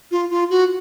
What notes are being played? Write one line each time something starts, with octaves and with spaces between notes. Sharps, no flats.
F4
F4
F#4